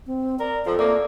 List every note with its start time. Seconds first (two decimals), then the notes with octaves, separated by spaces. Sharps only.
0.07 C4
0.39 A#4 D5
0.65 F2 F3 A4
0.79 A3 A#3 D5